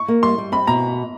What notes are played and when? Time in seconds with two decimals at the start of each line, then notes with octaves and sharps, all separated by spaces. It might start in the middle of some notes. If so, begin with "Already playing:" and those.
Already playing: C#6
0.08 A#3
0.23 G3 C6
0.38 G3
0.52 C4 B5
0.67 B2 A#5